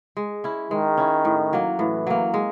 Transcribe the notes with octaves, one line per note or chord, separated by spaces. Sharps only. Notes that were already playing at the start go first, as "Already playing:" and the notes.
G#3
C#4 E4
D#3 G#3
C#4 E4
A2
F#3 A#3
A2 E3
F#3 A#3
G#3